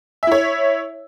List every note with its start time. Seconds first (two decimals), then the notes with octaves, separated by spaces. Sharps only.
0.23 E5
0.27 E4
0.32 C#5